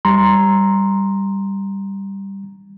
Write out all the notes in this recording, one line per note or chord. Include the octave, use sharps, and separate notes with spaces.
G3 A#5 C6